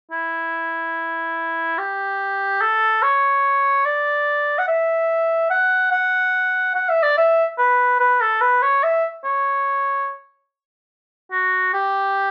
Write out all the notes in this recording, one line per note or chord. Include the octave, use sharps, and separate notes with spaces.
E4
G4
A4
C#5
D5
F#5
E5
F#5
F#5
F#5
E5
D5
E5
B4
B4
A4
B4
C#5
E5
C#5
F#4
G4